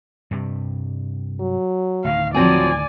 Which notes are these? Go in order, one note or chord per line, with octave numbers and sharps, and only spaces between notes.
G2 C3 G3
F#3
D2 A2 D#3 F5
F3 F#3 C4 G#4 D5 G#5